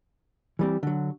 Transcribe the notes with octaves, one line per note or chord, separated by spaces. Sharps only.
E3 G3 C4
D3 F#3